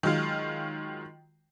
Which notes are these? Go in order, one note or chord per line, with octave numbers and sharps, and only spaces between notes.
D#3 F#3 G#3 F4